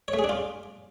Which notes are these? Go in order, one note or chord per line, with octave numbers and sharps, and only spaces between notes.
C#5
A3
G#4
D4
F4